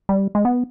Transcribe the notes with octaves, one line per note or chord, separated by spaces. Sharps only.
G3
G#3
B3